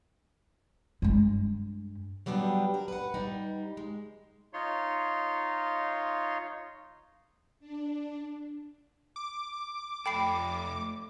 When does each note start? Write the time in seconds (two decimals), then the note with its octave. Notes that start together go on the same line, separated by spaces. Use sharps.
1.02 G2 G#3
2.26 F#3 G3 B3 D4 G4
2.74 A#4
2.88 B4 F#5
3.14 G3 D#4
3.77 G#3
4.53 D#4 F4 C#5 C6
7.60 D4
9.16 D6
10.06 F2 A3 A4 G5 B5 C7